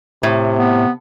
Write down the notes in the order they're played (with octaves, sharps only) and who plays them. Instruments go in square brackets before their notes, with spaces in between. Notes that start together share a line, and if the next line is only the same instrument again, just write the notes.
[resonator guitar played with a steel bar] A2 [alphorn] C3
[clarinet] B3